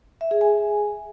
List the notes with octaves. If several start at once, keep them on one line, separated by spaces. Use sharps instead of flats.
E5
G#4
G#5